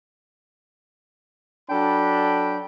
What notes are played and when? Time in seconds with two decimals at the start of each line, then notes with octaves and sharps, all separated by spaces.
1.70 F#3 D4 A4 G5 B5